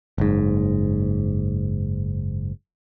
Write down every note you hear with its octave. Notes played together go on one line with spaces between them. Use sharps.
F#1 G#2